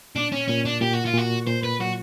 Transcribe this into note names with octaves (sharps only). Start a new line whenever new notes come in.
A#2 D4
C#4
A#2 C#4
D4
A#2 G4
F#4
F4
A#2 F#4
A#2 C5
B4
F#3 F#4